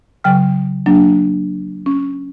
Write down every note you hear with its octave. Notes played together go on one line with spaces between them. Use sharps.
C#3 F#3 G5 F6
F#3 A#3 D4
C#4